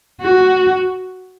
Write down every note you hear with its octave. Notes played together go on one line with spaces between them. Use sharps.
F#4